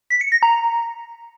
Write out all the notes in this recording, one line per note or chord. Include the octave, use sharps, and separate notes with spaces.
B6
C#7
A#6
A#5